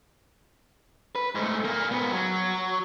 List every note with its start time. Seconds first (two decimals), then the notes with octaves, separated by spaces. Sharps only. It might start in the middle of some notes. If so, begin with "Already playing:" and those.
1.16 B4
1.35 G#2 A3
1.65 A#2 A#3
1.92 G#2 B3
2.12 F#3